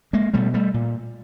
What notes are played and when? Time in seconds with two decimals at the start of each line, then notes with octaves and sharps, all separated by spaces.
0.13 G#3 A#3
0.34 B2 G3 A3
0.54 G3 A3
0.74 A#2